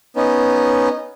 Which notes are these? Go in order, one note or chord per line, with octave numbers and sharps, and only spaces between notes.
B3 C#4 D#4